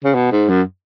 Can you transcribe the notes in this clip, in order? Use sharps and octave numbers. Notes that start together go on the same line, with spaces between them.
C#3
B2
G#2
F#2